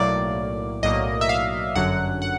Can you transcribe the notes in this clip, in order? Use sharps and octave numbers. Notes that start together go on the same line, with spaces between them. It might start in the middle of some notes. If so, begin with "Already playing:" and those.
Already playing: B1 A2 F#3 A#3 D5
B1 A2 F#3 A#3 D#5
E5
F5
G1 F#2 D3 F#3 F#5
F#5